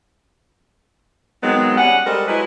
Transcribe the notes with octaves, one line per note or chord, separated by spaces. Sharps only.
D#3 F#3 G#3 B3 C4
G3 C#4 F#5
G3 G#3 A4 A#4 C5
F#3 G#3 E4 B4